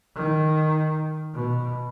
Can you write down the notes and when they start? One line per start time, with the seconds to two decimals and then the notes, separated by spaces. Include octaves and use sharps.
0.16 D#3
1.34 B2